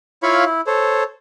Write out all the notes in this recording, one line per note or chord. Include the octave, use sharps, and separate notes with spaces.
E4 F4 C#5 F5 B5 C#6
E4
A4 C5 C#5